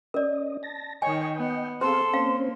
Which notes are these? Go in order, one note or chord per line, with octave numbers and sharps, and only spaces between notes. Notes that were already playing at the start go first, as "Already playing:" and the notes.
C#4 A#4 D5 D#5
A5 A#6
D#3 C#5 D#5 G5 G#5
B3
C4 G#4 A4 C5 F5 C6
A#3 C4 C#4 C5 F5